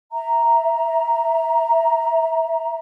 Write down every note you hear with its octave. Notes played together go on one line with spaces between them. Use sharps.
E5 A#5